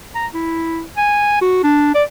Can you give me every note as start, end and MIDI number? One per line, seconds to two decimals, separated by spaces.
0.15 0.27 82
0.34 0.83 64
0.97 1.37 80
1.41 1.62 66
1.63 1.93 62
1.95 2.03 74